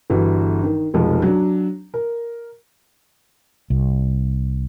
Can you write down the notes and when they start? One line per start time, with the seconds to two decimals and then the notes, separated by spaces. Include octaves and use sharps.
0.10 G1 E3 F#4
0.64 D#3
0.94 F1 B1 F3 G#3
1.22 F#3 D4
1.94 A#4
3.70 C2